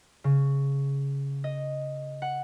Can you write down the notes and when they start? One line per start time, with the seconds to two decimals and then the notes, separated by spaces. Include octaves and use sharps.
0.24 C#3
1.44 D#5
2.22 F#5